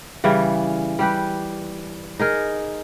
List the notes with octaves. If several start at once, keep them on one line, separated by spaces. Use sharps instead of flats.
C#3 E3 G3
G3 G4 B4
D#4 G#4 A#4